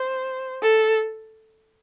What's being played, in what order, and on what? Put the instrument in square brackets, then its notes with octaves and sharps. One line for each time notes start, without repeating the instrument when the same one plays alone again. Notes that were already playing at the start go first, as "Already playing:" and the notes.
Already playing: [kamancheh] C5
A4